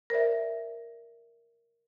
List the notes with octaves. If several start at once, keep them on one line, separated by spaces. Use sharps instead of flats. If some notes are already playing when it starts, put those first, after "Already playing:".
A#4 C5 D5 E5